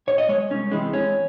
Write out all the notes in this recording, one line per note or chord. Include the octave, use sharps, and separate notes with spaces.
A2 C#5
D#5
G#3 C#5
C2 C#4
C3 E3 G#3
E2 C#4